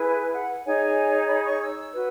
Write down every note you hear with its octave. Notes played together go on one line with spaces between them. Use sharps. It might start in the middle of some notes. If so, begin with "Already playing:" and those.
Already playing: E4 G#4 B4 G#5
F#5
D#4 G#4 C#5 G#5
B5
C#6
E6
F#4 B4